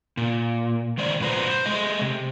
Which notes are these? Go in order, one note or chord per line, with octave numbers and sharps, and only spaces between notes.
A#2
D#3 G#3 C5 D5
G#2 B2 F3 B4 C5 A#5
C5
G#3 A3 D#5
C3